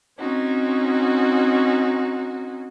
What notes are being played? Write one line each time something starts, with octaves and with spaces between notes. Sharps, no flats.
C4 C#4 D#4 F#4